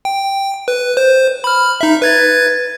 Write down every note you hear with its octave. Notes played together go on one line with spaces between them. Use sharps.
G5
B4
C5
B5 F6
D#4 E5
B4 G#6 A6